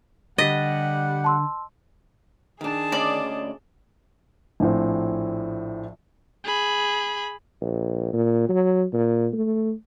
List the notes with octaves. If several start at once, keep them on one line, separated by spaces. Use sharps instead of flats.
D3 G3 D#5 F#5 A6 B6
A5 C6 E6
D#3 D4 G#4 A5
D2 C#4 D5 D#5
A#1 A2 C4
G#4 B5
A#1
A#2
F#3
A#2
A3